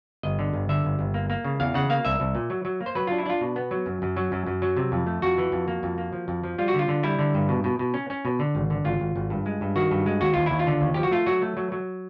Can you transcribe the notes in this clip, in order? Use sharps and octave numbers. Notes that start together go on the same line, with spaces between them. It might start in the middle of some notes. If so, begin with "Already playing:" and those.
G1 D#5
D3
G1
D3 E5
G1
G1
A#3
A#3
C#3
E2 F5
C#3 F#5
A#3 F5
C2 E5
C2
A#2
F#3
F#3
A#3
C5
F#3 B4
D4 F4
E4
D4 F4
B2
B3
F#3
F#2
F#2
F#3
F#2
F#2
F#3
C3
F2
A3
F2 F#4
E3
F2
A#3
F2
A#3
F3
F2
F3
G3 F4
F#4
D3 F4
D3
G3 E4
D3
G2
B2
B2
B2
C#4
C#4
B2
D3
G#1
D3
G#1 F4
G#1
G#1
G2
G#3
G2
D#3 F#4
G2
G#3
D#2 F#4
D#2 F4
D#2 E4
F4
D3
D#2
F3 G4
F#4
A3 F4
F#3 F#4
A3
F#3
F#3